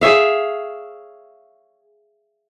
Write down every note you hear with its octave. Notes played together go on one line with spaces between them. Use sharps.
G#4 C#5 E5 F5